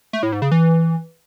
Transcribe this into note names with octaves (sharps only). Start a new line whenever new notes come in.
A3
A2
G#2
C#3
E3